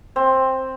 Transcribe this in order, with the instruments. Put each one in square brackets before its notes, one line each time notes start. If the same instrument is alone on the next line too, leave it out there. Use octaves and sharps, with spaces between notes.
[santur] C4